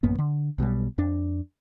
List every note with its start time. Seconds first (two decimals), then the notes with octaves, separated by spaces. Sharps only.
0.03 A1 F#2 A#3 B3
0.18 D3
0.58 B1 B2 F#3 G3
0.98 F2 D4